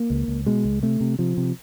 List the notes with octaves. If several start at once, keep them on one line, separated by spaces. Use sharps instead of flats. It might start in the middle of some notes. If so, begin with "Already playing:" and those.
Already playing: A#3
C#2
C#2
B2 G#3
C#2
C3 A3
C3
C3 F3
C3